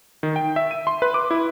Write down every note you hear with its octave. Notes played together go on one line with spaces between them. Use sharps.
D#3
G5
E5
D#7
C6
B4
D6
E4